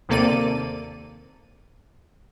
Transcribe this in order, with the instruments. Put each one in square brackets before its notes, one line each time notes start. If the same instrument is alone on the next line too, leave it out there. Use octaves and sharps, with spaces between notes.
[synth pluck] D#2 C3 A#3 A4 D5 D#7